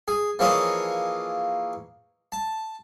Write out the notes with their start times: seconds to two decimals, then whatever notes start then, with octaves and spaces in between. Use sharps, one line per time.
0.08 G#4
0.39 E3 F3 A#3 G#4 C#5 D#5
2.32 A5